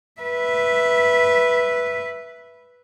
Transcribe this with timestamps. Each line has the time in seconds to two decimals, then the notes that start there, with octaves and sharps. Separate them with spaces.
0.21 B4 E5